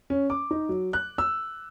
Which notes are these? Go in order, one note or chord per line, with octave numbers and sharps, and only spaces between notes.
C#4
D6
D#4
F#3
F#6
E6